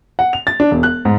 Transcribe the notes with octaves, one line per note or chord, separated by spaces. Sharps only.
F#5
F7
A6
D4
E1
F#6
G#2